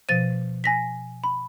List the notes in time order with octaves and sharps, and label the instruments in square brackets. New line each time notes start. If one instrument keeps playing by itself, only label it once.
[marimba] B2 F3 C5 [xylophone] A6 D#7
[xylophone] G#5 A#6 B6
B5